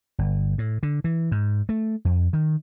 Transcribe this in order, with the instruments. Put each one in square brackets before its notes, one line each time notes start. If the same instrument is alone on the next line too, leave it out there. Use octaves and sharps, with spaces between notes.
[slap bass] G1
A2
D3
E3
G#2
A3
F2
D#3